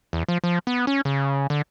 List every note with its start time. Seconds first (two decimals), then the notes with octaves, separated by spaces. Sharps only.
0.13 E2
0.28 F3
0.44 F3
0.67 B3
0.87 C#4
1.05 C#3
1.50 D3